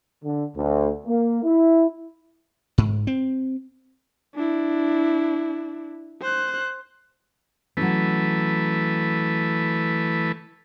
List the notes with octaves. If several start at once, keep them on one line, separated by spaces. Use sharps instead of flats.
D3
D2
A#3
E4
G#2
C4
D4 E4
C5 F#6
E3 F#3 A3 C#4 B4